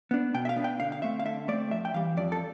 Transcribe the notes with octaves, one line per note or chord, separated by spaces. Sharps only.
B3 D4
B2 G5
E5
F5
B3 D4
G5
D3 F5
F5
A3 C4 E5
F5
D3 E5
A3 C4 D5
F2 E5
G5
E3 G3 F5
F2 D5
A4